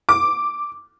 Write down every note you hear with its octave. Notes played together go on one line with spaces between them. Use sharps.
D6